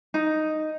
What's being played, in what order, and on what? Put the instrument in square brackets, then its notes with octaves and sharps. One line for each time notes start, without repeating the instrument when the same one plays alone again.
[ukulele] D#4